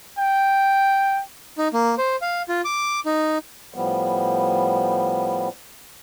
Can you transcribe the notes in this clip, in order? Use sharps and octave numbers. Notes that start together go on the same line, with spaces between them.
G5
D#4
A#3
C5
F5
F4
D6
D#4
A2 F3 G3 B3